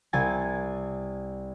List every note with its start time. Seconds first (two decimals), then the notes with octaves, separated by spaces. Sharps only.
0.13 C2 G#5 A6